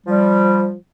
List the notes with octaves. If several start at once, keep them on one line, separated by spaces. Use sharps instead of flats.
F3 G3